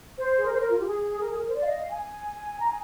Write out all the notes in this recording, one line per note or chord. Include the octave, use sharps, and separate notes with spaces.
C5
G#4
A#4
C5
A#4
F4
G4
G#4
A#4
G#4
A#4
C5
D5
F5
D#5
F5
G#5
A#5
G#5